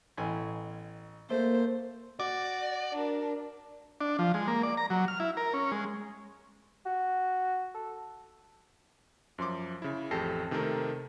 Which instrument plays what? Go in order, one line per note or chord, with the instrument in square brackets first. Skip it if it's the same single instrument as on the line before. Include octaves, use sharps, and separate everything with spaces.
[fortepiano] A1 B2 G#5
[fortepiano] A3 [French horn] A#3 [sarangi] C5
[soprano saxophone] F#4 [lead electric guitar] D5 [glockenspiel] D6
[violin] D4 A#4
[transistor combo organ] D4
F3
G#3
A#3
D5
A#5
F#3
F6
E4
A#4
C#4
G#3
[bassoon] F#4
A4
[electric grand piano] F#2 F3 C6 D6
C#3 E4
A1 F2 G4 A4 A#6 C7
C3 D#3 A3 A4 A#4